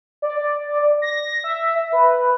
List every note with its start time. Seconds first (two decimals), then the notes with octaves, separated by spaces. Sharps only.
0.22 D5
1.02 A#6
1.44 E5
1.92 B4